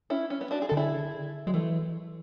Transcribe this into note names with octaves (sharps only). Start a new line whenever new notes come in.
C#4 E4
C#4
B3
D4 F#4
G#4
D3 A4
E4 G#4
F#3 G#3
E3 A3